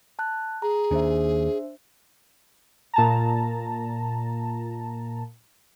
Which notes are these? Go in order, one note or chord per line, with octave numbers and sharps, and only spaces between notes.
A5 F#6
G#4 A#5
D#2 D4 C5 E5
A#2 A5 A#5